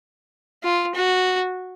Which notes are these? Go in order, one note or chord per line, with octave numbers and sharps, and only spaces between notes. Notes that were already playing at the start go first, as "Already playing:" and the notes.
F4
F#4